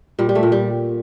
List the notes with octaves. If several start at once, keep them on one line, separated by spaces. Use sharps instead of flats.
A#2 G3
G3
A3
A#2
G3